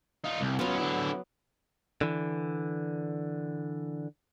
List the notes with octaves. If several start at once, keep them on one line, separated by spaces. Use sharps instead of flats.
D#4 F4
C2
F#3 B3 C#4 F4
D3 E4
D3 E3